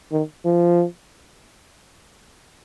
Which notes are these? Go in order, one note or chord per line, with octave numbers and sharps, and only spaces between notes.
D#3
F3